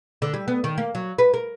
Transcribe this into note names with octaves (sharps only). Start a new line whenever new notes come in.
D3
G3
B3
D#3
A#3
F#3
B4
A#4